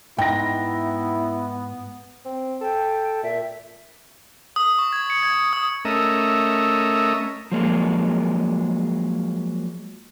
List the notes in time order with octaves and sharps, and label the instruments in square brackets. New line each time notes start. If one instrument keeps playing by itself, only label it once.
[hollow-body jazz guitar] G#2 [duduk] B3 [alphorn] E4 [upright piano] G5 A#6
[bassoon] C4
[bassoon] A4 [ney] G5
[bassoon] A#2 [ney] E5
[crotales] D#6
C#6
G#6
C#7
G#6
D#6
[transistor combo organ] A3 C#4 A#4 D#5 E5
[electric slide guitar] F3 F#3 G#3 A#3